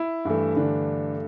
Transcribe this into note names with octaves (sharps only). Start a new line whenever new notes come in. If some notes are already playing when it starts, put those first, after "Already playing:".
Already playing: E4
G2 E3 A3
D3 D4